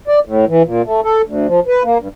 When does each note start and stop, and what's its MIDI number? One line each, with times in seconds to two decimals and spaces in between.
0.08 0.19 74
0.25 0.45 45
0.48 0.62 52
0.65 0.82 46
0.85 1.01 57
1.04 1.22 69
1.25 1.47 38
1.47 1.60 53
1.67 1.83 71
1.84 1.98 58
2.00 2.08 43